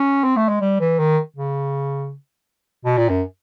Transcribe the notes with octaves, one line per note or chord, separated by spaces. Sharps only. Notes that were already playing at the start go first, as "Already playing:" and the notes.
Already playing: C#4
C4
A3
G#3
G3
E3
D#3
C#3
B2
A#2
F#2